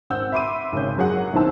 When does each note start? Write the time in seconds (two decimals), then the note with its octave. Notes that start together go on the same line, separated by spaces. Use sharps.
0.10 G#1 C4 F#5 E6 G6
0.32 E5 B5 C6 D6 E6 D#7
0.72 G#1 C#3 C#4 G6
0.97 F#1 F#3 G#4 F#5
1.33 B1 D#3 C4 E4 A5 E6